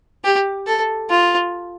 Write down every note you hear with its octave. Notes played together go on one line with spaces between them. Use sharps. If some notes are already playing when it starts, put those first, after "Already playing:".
G4
A4
F4